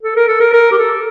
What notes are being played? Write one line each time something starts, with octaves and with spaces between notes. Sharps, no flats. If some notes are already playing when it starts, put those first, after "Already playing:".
A4
A#4
A4
A#4
A#4
G4
A4